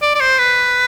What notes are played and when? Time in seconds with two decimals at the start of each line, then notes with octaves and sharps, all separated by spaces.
0.02 D5
0.15 D5
0.20 C5
0.39 B4